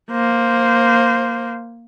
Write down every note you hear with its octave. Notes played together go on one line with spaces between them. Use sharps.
A#3 C5